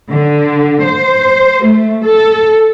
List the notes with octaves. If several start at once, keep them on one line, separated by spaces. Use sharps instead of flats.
D3
C5
A3
A4